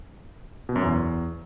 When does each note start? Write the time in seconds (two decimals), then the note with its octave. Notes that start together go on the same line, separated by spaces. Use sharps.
0.69 B2
0.76 F#2
0.82 E2